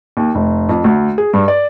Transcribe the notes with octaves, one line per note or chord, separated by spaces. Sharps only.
D#2
F1
F2
D2
G#4
G2
D5